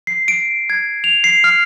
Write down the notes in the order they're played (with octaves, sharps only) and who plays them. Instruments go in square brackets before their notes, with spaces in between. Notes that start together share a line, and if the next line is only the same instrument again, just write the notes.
[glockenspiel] C7
D7
G#6
F7
C7
F6